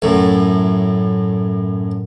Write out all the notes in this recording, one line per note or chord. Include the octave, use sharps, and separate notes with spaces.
F#2 A2